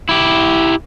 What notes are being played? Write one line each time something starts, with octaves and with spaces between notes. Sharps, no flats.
E4 G4